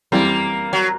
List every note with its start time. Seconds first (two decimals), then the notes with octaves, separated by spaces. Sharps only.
0.12 E3 G3 A#3 C4
0.73 F#3